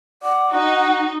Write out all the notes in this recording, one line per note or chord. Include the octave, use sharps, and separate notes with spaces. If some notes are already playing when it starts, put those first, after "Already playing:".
D5 F#5
D#4 F#4